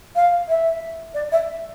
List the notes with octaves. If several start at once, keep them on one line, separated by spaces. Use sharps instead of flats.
F5
E5
D5
E5